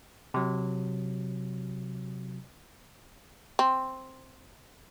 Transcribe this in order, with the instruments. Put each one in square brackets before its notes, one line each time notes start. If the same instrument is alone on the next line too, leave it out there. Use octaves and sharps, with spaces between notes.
[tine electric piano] C3 F#3
[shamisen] C4